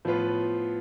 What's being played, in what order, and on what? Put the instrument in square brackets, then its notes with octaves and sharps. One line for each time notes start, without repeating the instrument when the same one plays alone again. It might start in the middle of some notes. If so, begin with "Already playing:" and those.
[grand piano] A2 F3 B3 F4 B4